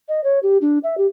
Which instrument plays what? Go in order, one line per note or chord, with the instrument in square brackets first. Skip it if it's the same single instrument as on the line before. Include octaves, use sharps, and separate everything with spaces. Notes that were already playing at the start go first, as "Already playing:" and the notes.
[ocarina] D#5
C#5
G4
D4
E5
G4